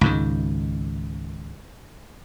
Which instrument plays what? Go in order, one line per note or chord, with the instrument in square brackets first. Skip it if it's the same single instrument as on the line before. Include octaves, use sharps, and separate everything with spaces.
[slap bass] C#2 G#2 D#3